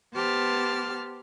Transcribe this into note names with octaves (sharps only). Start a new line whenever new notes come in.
B3 G4 C5 A5 F6